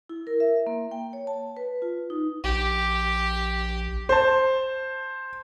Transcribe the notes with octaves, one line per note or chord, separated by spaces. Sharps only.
E4
A#4
E5
A#3
G5
C#5
A5
B4
F4
D#4
A#1 G4
C5 A5